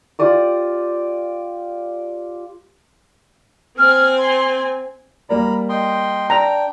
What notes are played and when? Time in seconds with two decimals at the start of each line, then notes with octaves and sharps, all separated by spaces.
0.19 F4 G4 D5 D#6
3.78 C4 G#5 F6
4.18 C6
5.29 G3 A#3 D5 A#5 B5
5.69 D#5 G5 C6
6.30 D4 G5 A#5